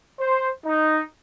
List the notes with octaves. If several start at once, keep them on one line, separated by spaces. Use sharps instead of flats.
C5
D#4